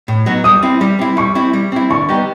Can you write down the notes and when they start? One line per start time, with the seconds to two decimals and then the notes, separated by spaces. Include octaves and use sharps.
0.08 A2
0.26 F#3 B3 D#4 F#4
0.44 G3 D#6
0.63 C4 E4
0.81 G3
0.99 C4 E4
1.17 G3 C#6
1.35 C4 E4
1.53 G3
1.72 C4 E4
1.90 D3 C#6
2.09 G3 B3 D#4 G4